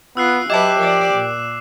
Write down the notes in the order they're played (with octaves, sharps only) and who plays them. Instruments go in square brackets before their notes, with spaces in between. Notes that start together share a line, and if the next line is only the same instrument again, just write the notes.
[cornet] B3 [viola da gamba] F4 [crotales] E6 F#6 C7
[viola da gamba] F#3 B4 [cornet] G4 [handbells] D#5 E5 A5 [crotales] D6 E7
[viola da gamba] F3 D5 [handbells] A#4
[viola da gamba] A#2